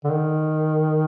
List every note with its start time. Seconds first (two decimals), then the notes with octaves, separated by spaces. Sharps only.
0.04 D3
0.11 D#3